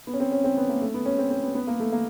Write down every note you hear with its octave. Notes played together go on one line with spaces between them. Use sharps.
B3
C#4
C4
C#4
C4
B3
A#3
A3
B3
C#4
C4
C4
B3
B3
A#3
A3
A#3